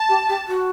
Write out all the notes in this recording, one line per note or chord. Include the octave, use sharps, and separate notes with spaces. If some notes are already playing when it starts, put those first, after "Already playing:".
Already playing: A5
G4
G4
F#4